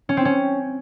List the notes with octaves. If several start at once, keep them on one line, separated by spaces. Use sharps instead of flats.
C#4
C4
C#4